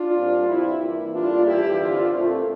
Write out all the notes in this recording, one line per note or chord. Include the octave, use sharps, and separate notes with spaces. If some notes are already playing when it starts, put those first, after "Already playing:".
Already playing: D4 F4
A#2 G3 C4
G2 F3 C4 E4
G2 E3 A#3 E4
A2 G3 A#3 D4 F4
F2 E3 G3 E4 G4
G2 D3 G3 C4 D4 F4
A#2 A3 C4